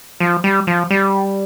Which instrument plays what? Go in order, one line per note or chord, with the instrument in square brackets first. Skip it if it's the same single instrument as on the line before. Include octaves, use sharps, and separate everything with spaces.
[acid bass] F3
G3
F3
G3